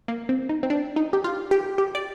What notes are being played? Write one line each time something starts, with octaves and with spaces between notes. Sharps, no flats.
A#3
C4
D#4
C4
D4
D#4
G4
F4
G4
G4
D5